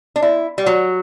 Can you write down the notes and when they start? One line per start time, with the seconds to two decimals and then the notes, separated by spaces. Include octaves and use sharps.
0.16 D4
0.22 E4
0.58 G3
0.66 F#3